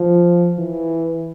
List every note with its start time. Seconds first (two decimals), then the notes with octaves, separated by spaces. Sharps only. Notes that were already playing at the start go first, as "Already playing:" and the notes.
Already playing: F3
0.59 E3